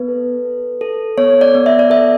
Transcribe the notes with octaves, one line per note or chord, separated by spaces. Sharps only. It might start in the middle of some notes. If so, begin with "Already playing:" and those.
Already playing: B3 B4
A4
A4
A4
B3 C#5
D5
B3
E5
D5
A4 E5